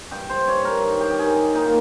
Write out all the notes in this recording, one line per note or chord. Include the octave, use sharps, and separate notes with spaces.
G2 G5
C5
G2 C#5
A#4
D#3
G4
G4
D#3 G#4
G4
A#2 D#4
A#3